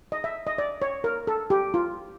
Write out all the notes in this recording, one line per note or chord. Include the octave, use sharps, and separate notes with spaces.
D#5
E5
D#5
D5
C#5
A#4
A4
G4
F4